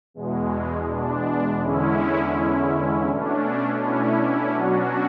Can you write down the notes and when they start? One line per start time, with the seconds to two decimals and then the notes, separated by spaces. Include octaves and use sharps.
0.14 E2 B2 G#3
0.87 D4
1.61 E2 D3 G#3 C#4 E4
3.08 B2 A3 C#4 D4
3.81 C#4 E4
4.18 C#4 E4
4.54 B2 F#3 C#4 D4 F#4